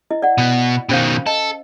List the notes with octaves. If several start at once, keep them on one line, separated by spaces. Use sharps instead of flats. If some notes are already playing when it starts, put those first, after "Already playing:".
E4 D#5
D5 F#5
B2 B3
B2 D#3 C#4 C5 F5
A4 D#5